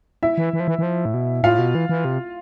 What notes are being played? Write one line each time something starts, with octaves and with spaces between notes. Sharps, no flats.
E4 E5
E3
E3
F3
E3
E3
F3
A2
B2
A2 F4 F5
B2
E3
E3
C3